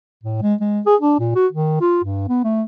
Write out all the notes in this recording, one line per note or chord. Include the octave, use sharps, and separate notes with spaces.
A2
G#3
G#3
G#4
D4
A#2
F#4
D#3
F4
G2
B3
A3